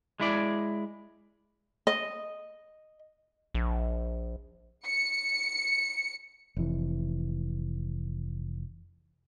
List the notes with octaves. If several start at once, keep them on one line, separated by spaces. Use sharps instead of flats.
G#3 E4 D5
D#5
A#1
C#7
F1 E3